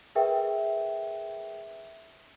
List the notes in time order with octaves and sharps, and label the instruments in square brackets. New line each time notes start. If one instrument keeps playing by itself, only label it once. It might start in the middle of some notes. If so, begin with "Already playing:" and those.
[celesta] G#4 A#4 B4 E5 G5